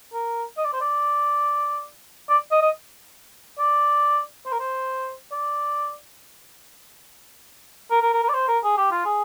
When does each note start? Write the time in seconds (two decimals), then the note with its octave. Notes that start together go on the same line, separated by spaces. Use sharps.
0.13 A#4
0.57 D#5
0.65 D5
0.73 C5
0.81 D5
2.29 D5
2.51 D#5
2.62 D#5
3.59 D5
4.46 C5
4.52 A#4
4.60 C5
5.32 D5
7.91 A#4
8.02 A#4
8.13 A#4
8.23 A#4
8.29 D5
8.34 C5
8.48 A#4
8.64 G#4
8.77 G4
8.91 F4
9.06 G#4